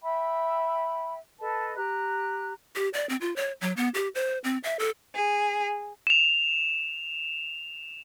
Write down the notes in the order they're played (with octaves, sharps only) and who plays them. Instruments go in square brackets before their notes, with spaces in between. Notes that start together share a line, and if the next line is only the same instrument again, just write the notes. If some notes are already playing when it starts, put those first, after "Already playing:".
[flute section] E5 G5 B5
A4 B4 D#5 A5
G4 A#5 F#6
[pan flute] G4
D5
C4
F4
C#5
F#3
B3
G4
C5
C4
E5
A4
[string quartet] G#4
[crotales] E7 F7